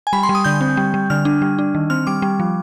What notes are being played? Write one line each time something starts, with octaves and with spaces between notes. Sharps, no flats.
G#5
G3 B5
C6
G3
D#6
D3 G6
C4
G3
G3
D3 F6
D4
G3
D4
D#3
C4 F6
G3 D6
G3
F3